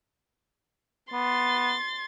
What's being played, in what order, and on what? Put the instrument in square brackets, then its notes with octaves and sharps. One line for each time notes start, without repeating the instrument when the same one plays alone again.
[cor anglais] B3 [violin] C6 A6